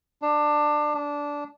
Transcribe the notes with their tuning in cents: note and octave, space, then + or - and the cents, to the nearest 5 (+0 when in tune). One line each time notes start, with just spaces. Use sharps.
D4 +20
D4 -15